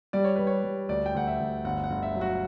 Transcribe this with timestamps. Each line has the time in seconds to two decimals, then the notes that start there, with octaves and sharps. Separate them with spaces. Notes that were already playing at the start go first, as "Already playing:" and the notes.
0.13 G3 D5
0.24 C#5
0.36 G3 B4
0.47 C#5
0.64 G3
0.89 D2 D5
1.06 G5
1.14 D2 F#5
1.27 E5
1.40 D2
1.64 G1 F#5
1.84 F#5
1.90 G1
2.03 E5
2.15 F#3
2.21 F#4